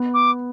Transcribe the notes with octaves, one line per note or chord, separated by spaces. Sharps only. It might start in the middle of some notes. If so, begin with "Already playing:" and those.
Already playing: B3
D6